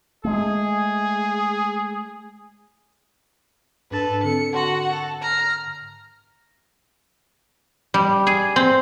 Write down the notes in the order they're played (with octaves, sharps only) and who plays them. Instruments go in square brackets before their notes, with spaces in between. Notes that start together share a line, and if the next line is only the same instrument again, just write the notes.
[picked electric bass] G#3 A3 [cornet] G#4
[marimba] G#2 D4 A6 [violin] A4 B4
[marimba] D3 C4 A4 [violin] C#7
[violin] F#4 F#5 [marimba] A5 C6
[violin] A4
A#5 F6
[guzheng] G3
G#4
C4